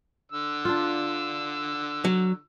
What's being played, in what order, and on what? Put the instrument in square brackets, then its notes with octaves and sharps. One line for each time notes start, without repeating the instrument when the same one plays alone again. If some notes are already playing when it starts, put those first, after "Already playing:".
[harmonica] D3 E6
[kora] D4 F4
[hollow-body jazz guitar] F#3